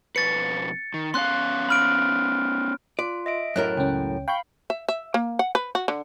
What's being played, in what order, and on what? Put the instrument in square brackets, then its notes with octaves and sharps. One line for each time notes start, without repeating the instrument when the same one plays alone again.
[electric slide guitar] F2 B2 B4 [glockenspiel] A6 C#7
[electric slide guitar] D#3
[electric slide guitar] B3 C#4 F5 [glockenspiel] C6 F#6
[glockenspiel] B5 F6 D7
[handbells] F4 [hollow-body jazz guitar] D5
[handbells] D#5 E5 D7
[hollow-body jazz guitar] F#2 A2 A#4 [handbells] F#6
[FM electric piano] C#2 C#4 [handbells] G5
[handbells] F5 B5 [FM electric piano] G5 C#6 G6
[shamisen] E5
E5
A#3
F#5
B4
F#4
D3